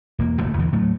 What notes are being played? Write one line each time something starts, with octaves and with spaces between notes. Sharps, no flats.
E1 A#3
D1 E2 D3 A3
E2 D3 E3
A2 F#3 A3